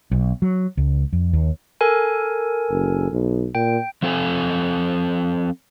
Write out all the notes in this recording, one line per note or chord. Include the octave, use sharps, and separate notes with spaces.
B1
F#3
C#2
F2
D#2
A4 A#4 G#5
F#1
B1
A#2 G5
F3 C4 A4 E5 G#5